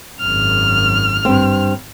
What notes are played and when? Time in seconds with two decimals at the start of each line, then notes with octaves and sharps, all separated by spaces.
0.20 G#1 F#2 F6
1.25 G2 C4